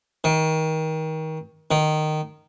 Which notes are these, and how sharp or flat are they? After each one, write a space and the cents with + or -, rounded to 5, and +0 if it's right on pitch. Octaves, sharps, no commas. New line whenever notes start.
D#3 +25
D#3 -15